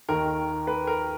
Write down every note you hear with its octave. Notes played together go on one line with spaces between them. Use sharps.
D#2 D#3 A#4
B4
A#4